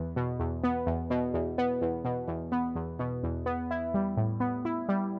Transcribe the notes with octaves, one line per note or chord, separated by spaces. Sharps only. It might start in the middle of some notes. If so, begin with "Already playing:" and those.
Already playing: E2 B3
B2
E2
B3
E2
B2
E2
B3
E2
B2
E2
B3
E2
B2
E2
B3
E4
G3
A2
B3
E4
G3